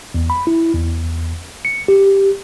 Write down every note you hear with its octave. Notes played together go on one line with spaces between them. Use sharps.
E2
B5
E4
E2
C#7
G4